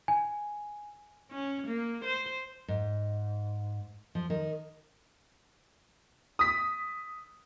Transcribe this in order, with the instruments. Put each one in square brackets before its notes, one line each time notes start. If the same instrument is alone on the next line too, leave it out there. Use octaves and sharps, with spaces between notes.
[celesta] G#5
[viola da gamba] C#4
A#3
C5
[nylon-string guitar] G#2
F3
D#3
[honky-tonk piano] D#6 B6